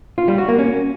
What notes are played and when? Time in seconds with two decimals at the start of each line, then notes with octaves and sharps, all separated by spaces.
0.18 F4
0.28 G3
0.38 F#4
0.48 A#3
0.59 C#4